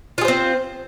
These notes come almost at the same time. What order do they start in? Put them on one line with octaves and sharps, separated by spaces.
F4 G#4 C5 C4